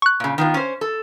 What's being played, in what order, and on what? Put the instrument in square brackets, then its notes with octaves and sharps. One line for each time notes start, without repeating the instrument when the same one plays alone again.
[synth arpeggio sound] C#6 F#6
[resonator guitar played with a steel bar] A#2 C#3
D#3 B3 F4
C#4 C5
A4